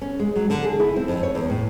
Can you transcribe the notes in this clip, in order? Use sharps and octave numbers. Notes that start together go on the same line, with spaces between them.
C#4
G#3
F#3
D3
G#4
E4
C4
F2
C#5
E2
A2